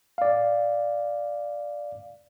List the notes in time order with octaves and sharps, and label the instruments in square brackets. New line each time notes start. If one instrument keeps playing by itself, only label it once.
[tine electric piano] D5 F5